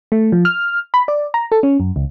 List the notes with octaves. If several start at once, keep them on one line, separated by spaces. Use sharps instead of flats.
A3
F3
F6
B5
D5
A#5
A4
C#4
F#2
C#2